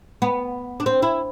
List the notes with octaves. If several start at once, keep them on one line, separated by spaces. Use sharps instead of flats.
B3
D4
C4
E4